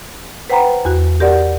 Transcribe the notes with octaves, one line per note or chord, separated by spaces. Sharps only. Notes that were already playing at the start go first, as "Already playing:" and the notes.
B4 C5 F#5 G5 A#5 B5
E2 F#4
G4 A#4 D5 F#5